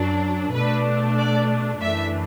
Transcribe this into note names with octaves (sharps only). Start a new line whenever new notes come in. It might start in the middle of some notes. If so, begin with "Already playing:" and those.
Already playing: F#2 F#3 D4
B2 A3 D4 B4
D5
F#2 E3 A3 D4 E5